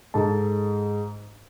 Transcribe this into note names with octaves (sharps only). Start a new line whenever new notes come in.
G#2 G#3 A4 A5